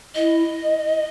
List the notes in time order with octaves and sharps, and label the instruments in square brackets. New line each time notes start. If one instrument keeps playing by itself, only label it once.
[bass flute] E4 [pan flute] D#5